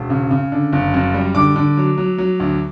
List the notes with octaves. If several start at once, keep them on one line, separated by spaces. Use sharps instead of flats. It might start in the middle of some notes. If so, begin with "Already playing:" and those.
Already playing: E1
C#3
C#3
D3
F#1
F#2
G3
D3 D6
D3
F#3
F#3
F#3
D2